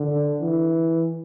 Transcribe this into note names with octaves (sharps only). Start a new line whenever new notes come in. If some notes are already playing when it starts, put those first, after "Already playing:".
Already playing: D3
E3